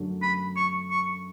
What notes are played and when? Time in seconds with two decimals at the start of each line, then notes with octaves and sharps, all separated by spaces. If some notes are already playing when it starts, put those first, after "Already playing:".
Already playing: F#2 D3 A3 D4 F#4
0.22 B5
0.56 C#6
0.91 C#6